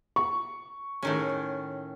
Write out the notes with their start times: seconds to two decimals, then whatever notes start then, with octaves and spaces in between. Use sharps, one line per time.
0.16 C#6
1.03 A2 D#3 C#4